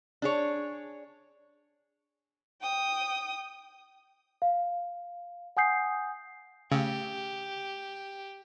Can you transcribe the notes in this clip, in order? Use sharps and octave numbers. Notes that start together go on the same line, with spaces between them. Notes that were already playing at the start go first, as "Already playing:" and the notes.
D4 G#4 C#5
G5 D#6
F5
F#5 G#5 D#6 G6 C7
C#3 A3 G4